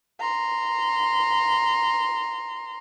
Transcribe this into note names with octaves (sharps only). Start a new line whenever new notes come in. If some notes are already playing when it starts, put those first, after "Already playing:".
A#5 C6